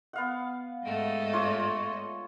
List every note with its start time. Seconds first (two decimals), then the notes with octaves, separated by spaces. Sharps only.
0.13 B3 F5 F#5
0.84 G#2 A3 D#5
1.33 D4 F4 C#5